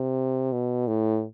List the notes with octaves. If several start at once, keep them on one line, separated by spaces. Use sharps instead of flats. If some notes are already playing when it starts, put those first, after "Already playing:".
Already playing: C3
B2
A2